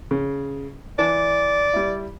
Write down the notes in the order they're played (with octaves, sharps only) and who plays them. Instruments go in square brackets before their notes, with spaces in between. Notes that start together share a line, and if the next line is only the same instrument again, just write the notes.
[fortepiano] C#3
[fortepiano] E3 [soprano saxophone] D5
[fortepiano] G3 E4